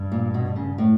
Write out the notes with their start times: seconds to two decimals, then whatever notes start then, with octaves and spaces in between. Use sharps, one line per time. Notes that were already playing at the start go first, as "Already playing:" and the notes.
Already playing: G2
0.12 A#2
0.34 B2
0.56 C#3
0.78 A2